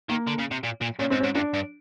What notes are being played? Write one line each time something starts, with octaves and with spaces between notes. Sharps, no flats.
D#3 A#3
D3
C#3
C3
A#2
A#2
A#2 C#4
G#2 C4
C#4
G#2
G2 D4
G2